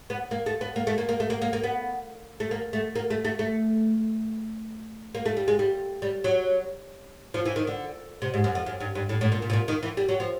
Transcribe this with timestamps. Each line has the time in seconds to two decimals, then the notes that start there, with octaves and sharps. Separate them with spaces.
0.10 B3
0.31 A#3
0.46 A3
0.61 B3
0.76 A#3
0.87 A3
0.98 A#3
1.09 A#3
1.20 A3
1.30 A#3
1.42 A#3
1.53 A#3
1.63 B3
2.40 A3
2.51 A#3
2.73 A3
2.96 A#3
3.10 A3
3.25 A3
3.39 A3
5.15 A#3
5.26 A3
5.37 G3
5.48 G#3
5.59 G3
6.02 G3
6.24 F#3
7.34 F3
7.46 E3
7.56 D#3
7.67 D3
8.22 C3
8.34 G#2
8.44 F#2
8.55 F2
8.66 F#2
8.80 G2
8.95 G2
9.09 A2
9.21 A2
9.32 A#2
9.42 A#2
9.50 B2
9.53 A#2
9.68 D#3
9.83 E3
9.97 G3
10.09 F#3
10.20 F3